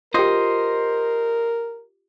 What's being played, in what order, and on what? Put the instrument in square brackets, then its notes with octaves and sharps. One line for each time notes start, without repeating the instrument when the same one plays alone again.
[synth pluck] F4 G4 [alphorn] A#4 [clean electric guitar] C5 D#5